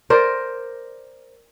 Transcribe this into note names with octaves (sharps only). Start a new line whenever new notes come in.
A#4 C5 D5